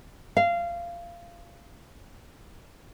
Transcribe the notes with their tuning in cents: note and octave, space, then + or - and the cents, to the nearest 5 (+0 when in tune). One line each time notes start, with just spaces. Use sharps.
F5 -20